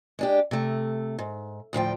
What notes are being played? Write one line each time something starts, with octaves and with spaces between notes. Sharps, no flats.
G#3 D4 G4
C3 A3
G#2
D2 A2 F3 G5